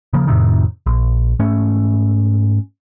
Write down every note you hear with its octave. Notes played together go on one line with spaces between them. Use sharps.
C#3 F3 A#3
F2 A2 C3 D#3
A#1
G#2 A3 C#4